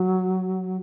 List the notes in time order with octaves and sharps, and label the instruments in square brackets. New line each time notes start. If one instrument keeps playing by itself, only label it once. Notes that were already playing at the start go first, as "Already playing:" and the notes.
Already playing: [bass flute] F#3